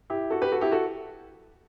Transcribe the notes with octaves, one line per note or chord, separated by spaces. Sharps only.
E4 G4
F#4 A4
G4 B4
F#4 A4
E4 G4
F#4 A4